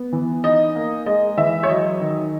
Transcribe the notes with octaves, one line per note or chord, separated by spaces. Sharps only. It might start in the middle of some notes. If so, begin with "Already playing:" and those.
Already playing: B3
E3
D#4 D#5
A#3
G#3 D#5
E3 E5
C#5
F#3 D#5
D#3